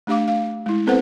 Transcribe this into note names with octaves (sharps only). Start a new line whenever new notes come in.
A3 D4 G4 F5 D6
F5
G#3 E4
B3 C4 A4 B4 C5 F#5